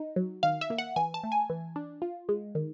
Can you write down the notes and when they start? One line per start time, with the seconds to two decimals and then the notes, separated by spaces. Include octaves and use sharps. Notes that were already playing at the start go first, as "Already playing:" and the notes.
Already playing: D#4
0.16 F#3
0.43 D#3 F5
0.61 E5
0.70 A#3
0.78 F#5
0.96 E3 G#5
1.14 A5
1.23 A3
1.32 G#5
1.50 E3
1.76 D4
2.02 F4
2.29 G#3
2.55 D#3